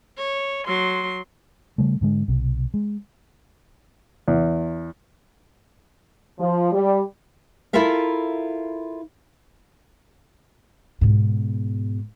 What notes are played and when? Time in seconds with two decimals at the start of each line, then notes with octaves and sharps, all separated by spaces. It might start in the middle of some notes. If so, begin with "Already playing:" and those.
0.18 C#5
0.67 F#3 C6
1.78 C#3 G3 A3
2.01 G#2 D3 G#3
2.28 B1 C3
2.74 G#3
4.28 E2
6.39 F3
6.72 G3
7.73 E4 F4 A4 A#4 E5 F5
11.01 G#2 B2